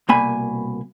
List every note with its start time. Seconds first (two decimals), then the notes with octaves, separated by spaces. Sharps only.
0.09 C2 B2 A#3 G#5 B5